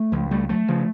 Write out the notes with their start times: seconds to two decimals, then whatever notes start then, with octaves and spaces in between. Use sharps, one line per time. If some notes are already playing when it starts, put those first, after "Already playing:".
Already playing: A3
0.12 C#2 F3
0.31 G3 A3
0.49 F#3 A3
0.68 C#3 F3